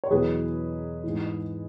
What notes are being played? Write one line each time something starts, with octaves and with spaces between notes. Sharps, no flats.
C#5
E2 B2 F#3 G#4 B4
G#2 E3